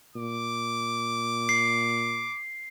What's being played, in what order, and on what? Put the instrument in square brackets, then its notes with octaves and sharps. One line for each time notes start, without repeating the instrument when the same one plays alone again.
[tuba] A#2 [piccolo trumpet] D6
[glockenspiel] C7